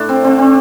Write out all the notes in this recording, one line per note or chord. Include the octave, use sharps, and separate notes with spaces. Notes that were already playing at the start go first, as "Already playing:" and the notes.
Already playing: A2 A3 D4
C4
D3 A3 C4
C4